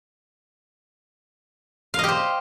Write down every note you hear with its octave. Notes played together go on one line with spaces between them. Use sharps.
G4 C5 D#5 F5